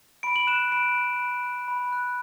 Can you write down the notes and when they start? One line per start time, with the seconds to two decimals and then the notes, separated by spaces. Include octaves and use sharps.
0.23 B5 D7
0.36 F#7
0.47 F#6 E7
0.72 B5 D7
0.96 F#6
1.20 B5
1.44 F#6
1.68 B5
1.93 F#6